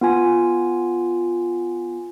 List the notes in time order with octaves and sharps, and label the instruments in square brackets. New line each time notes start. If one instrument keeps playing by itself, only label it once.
[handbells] B3 F4 G#5